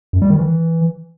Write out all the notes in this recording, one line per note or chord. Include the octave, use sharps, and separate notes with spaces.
F#2
G3
D#3
E3